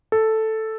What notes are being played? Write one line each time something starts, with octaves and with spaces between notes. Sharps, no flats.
A4